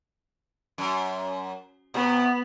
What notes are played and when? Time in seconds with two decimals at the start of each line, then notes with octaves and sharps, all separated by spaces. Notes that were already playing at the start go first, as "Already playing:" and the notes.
0.78 F#2
1.94 C3 B3